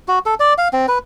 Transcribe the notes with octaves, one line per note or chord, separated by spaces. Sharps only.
F#4
A4
D5
F5
C4
B4